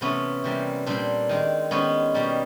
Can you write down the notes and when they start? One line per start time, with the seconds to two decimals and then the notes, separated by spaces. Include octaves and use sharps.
0.01 C3 E3 A3 B3 C#4
0.44 C3 E3 G3 A#3
0.86 A#2 G3 A#3 C4 D4
1.29 D#3 G#3
1.71 D#3 G#3 B3 C#4
2.14 B2 G3 A#3